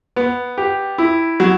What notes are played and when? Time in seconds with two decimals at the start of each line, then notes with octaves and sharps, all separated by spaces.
0.16 B3
0.58 G4
0.98 E4
1.40 F#3